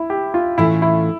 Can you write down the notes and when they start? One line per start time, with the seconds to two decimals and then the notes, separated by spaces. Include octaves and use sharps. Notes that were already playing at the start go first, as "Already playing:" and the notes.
Already playing: E4
0.10 G4
0.34 F4
0.58 A2 E3 A3 C#4 E4 F4
0.82 E4